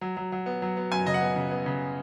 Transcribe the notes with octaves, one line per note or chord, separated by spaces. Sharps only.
F#3
F#3
F#3
B3
F#3
B3
F#2 G#5
C#3 D#5
F#5
B3
C#3
B3
C#3